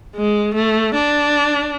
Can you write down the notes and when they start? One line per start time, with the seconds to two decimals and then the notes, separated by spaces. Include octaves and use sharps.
0.16 G#3
0.54 A3
0.94 D4